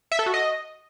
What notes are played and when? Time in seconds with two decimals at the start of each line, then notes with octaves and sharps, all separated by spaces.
0.12 E5
0.19 A4
0.26 F#4
0.34 D#5